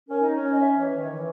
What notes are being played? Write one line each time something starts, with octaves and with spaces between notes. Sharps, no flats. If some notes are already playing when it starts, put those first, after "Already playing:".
C#4 A#4
D#4
C#4
C#5
D#5
E5
E3 C#5
D#3
E3